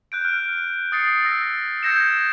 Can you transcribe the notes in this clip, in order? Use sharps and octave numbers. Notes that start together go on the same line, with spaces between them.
F#6 G6 D7
F6
D#6 A6 C7 C#7
E6 A#6
E6 G6 G#6 A#6 C#7 E7